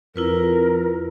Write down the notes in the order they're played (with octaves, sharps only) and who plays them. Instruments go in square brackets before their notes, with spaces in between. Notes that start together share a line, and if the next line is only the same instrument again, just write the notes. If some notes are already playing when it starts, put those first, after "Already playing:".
[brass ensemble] F2 [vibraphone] E4 F4 B4 [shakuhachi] A#4